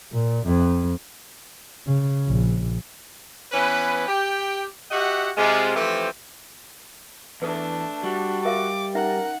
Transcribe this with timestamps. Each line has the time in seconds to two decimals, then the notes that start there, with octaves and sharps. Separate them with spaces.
0.12 A#2
0.46 F2
1.87 C#3
2.27 A#1
3.52 E3 B3 C#4 B4
4.08 G4 G5
4.91 F#4 G4 D#5 E5 F#5
5.37 C3 G#3 F4
5.76 E3 F3 A3 C4 G4 C5
7.42 E2 A3 D4 A4 B4
8.03 G3 F#4
8.45 A#4 E5 F5 D6
8.95 C#4 D#4 A#4 E5 F#5